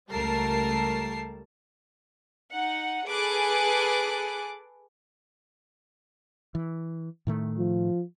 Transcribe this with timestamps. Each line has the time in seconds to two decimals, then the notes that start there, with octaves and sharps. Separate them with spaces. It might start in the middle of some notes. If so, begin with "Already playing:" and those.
0.12 C#2 G3 A3 A#4 A5 C7
2.53 D#4 F#5
3.07 G#4 A4 B4 D6 F#6
6.55 E3
7.27 A2 D#3 A3
7.58 F3